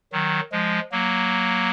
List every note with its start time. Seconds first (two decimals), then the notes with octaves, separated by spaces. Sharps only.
0.13 D#3 F#3
0.52 F3 G#3
0.92 F#3 A#3